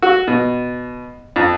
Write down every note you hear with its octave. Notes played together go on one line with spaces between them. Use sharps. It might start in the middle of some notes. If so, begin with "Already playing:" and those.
F#4
B2
F2